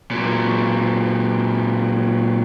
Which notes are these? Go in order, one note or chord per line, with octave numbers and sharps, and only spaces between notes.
A#2 F#3